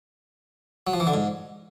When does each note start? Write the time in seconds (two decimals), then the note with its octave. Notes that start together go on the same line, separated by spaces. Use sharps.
0.87 F#3
0.93 F3
1.00 E3
1.07 D3
1.14 G#2